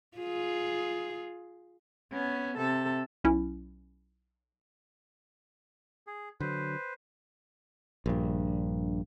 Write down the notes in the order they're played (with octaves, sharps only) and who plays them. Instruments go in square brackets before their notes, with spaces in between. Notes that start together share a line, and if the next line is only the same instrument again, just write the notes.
[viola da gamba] F4 G#4
[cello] B3 C#4
C3 A4
[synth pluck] B1 C#4 E4
[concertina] G#4
[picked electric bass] D3 F#3 [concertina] B4 C5
[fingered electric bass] A#1 G2